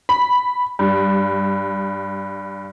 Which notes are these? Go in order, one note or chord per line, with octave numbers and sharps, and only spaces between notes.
B5
G2